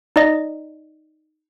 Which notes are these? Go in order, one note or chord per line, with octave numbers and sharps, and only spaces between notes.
D#4 D5 D#5 A#6